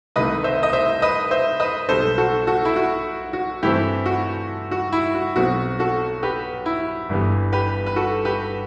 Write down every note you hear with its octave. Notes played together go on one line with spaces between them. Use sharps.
C2 C3 D#3 A3 B4 D#5
C5 E5
D#5
C5 E5
B4 D#5
C5 E5
B4 D#5
B1 B2 G3 B3 A4 C5
F#4 A4
F#4 A4
E4
F#4
F#4
G2 E3 A3 C4 E4 G4
F#4
F#4
E4
F#4
B1 B2 F#3 C4 F#4
F#4 A4
G4 B4
E4
G1 G2 E3 G3 B3
G4 B4
B4
F#4 A4
G4 B4